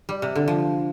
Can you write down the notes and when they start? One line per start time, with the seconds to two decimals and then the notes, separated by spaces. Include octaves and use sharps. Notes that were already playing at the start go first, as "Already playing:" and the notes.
0.09 G3
0.22 C3
0.36 D3
0.48 F3